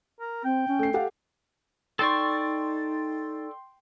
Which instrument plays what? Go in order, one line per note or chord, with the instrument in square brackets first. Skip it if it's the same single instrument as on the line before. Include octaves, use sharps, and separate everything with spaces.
[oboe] A#4
[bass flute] C4 [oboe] G5
[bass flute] C#4
[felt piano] A3 C7
[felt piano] G4 A4 F#5 [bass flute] F5
[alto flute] D#4 [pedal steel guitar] A4 D5 C#6 [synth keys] G5 C6